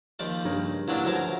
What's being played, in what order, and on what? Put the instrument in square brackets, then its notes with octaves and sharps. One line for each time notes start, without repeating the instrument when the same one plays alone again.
[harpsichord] D#2 F3 D5
[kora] G2 C#3 A#4
[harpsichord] A#2 F#3 D4 [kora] E3
[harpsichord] D2 A#4 A5 [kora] F3 F#3